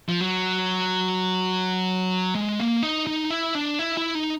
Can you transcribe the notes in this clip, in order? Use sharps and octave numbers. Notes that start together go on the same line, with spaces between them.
F3
F#3
G#3
A#3
D#4
D#4
E4
D4
E4
E4
D#4